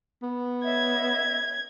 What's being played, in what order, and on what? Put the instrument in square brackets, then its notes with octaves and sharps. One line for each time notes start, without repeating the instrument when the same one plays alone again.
[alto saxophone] B3
[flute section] C#5 D#5 E5 [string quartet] G#6